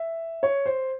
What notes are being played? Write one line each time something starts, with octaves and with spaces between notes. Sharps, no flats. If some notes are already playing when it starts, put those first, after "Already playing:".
Already playing: E5
C#5
C5